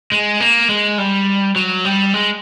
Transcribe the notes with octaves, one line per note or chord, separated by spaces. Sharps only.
G#3
A#3
G#3
G3
F#3
G3
G#3